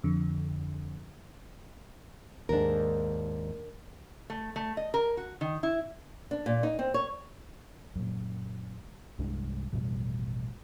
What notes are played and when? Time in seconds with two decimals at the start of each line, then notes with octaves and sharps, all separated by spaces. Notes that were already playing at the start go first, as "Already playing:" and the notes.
0.04 F2 D3
2.49 D#2 G#2 D4 A#4
4.30 A3
4.56 A3
4.77 D#5
4.94 A#4
5.17 F#4
5.41 D#3
5.63 E4
6.31 D4
6.46 A#2
6.63 D#4
6.79 C4
6.94 C#5
7.96 F#2 A#2
9.19 C2 G2 G#3 D4
9.73 A1 F2 B2 G3